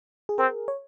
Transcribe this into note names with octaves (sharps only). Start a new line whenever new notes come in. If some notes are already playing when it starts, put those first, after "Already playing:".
G#4
C4 A#4
C#5